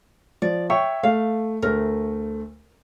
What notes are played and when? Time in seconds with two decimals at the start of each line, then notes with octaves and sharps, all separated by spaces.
0.42 F3 D5
0.70 C#5 E5 G5 C#6
1.03 A3 F5
1.62 D2 A3 A#4